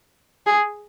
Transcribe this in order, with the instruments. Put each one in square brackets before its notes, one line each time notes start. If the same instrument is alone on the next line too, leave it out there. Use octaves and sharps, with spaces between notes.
[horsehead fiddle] G#4